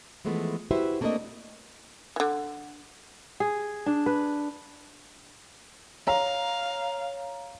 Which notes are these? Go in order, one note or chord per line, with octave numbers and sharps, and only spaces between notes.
E3 F3 G#3 A3 B3
E4 F#4 G4 B4 C5 E5
A3 A#3 C4 D4 A#4 D#5
D3 E3
G#4
D4
B4
C#5 F5 A#5